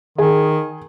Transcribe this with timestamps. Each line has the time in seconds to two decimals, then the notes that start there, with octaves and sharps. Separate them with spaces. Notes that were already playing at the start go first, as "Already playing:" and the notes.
0.18 D#3 G#4